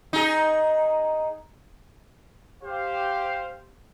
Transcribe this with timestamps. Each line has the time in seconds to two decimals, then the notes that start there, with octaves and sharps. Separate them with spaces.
0.13 D#4 G#4
2.64 G4 C5 F5